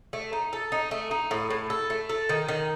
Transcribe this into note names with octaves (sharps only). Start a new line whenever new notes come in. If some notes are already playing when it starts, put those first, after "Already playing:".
A3
D#4
A4
D#4
A3
D#4
A2
A2
A4
A3
A4
D#3
D#3